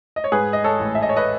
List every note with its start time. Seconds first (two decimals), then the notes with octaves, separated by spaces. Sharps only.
0.16 D#5
0.24 C#5
0.32 G#2 G#4 B4
0.53 D#5
0.64 A4 C#5
0.79 A1
0.95 E5
1.03 D#5
1.09 C#5
1.16 B4 D#5